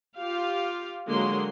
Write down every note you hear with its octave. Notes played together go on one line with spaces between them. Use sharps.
F4 G4 F5
D3 F#3 G#3 A#3 C6